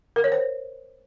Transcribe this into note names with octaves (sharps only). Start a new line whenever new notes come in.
A#4
C#5
C5